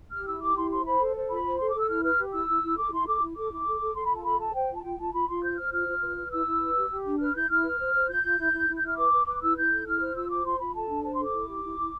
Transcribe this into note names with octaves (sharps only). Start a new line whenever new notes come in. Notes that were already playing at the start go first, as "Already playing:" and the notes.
G4 F6
E4 E6
G4 D6
E4 C6
C5 C6
C5 B5
A4
C5
F4 B5
C5
A4 C6
A4 D6
E6
E4 F6
B4 F6
G4
E4 E6
E4
E4
A4 D6
E4 C6
A4 D6
E4
A4 D6
E4
A4
A4
A4 C6
B5
F4 A5
A4 B5
A4 A5
C5 G5
F4
A5
F4 G5
F4 A5
F4 B5
F4 C6
C5 G6
C5 F6
F4 F6
F4
B4
B4
E4 E6
E4
B4
G4
G4
D4
B4 F6
E4 G6
E4 F6
B4
C5
C5
F4 G6
F4
E4
E4
E4
G6
E4 F6
B4 D6
B4
B4 D6
E4 E6
E4 G6
A4
E4 F6
C5
F4 E6
C5 D6
F4 C6
F4 B5
A4 A5
D4
C5 A5
A4 C6
D6
E4
G4
E4
E4